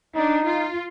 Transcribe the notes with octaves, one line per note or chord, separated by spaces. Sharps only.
D4 D#4
F4